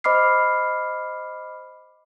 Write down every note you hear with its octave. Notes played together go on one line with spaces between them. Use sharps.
C5 D#5 B5 D6 F6 C7